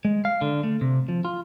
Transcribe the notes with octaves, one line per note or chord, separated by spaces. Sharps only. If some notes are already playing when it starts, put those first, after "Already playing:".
G#3
F5
D3
A3
C3
F3
F4